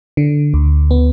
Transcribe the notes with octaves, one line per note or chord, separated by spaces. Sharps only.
D3
D2
B3